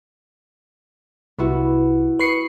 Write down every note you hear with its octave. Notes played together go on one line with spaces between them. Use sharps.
C2 B3 E4 F#4
B4 C#6 D#6 C7 C#7